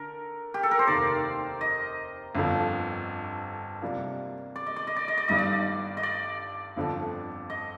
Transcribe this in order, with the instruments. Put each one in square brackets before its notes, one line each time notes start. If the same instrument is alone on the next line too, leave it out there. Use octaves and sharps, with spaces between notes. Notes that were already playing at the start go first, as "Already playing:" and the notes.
Already playing: [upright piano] D3 [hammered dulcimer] A#4
[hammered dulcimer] G4
A4
A#4
C5
[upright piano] F1 D#2 D#3 A#3 [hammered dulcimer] D5
[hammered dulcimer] D#5
[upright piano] G1 F2 D3 F3
C3 G3 A#3 D4 F4
[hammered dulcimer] D5
D#5
D5
D#5
D5
D#5
D5
[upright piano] G1 G2 D#3 G3 [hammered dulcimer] D#5
[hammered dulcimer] D5
D#5
D5
[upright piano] G1 F2 D3 F3
[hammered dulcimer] D#5